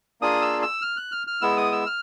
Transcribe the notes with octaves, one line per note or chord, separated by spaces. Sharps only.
A#3 D4 F4 G#4 D#6
E6
E6
F6
F#6
F6
F6
G#3 B3 E4 E6
D#6
E6
F6